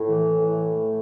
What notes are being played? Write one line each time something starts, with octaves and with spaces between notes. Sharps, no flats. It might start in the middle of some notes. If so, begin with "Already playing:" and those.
Already playing: A2
E3
A2
A3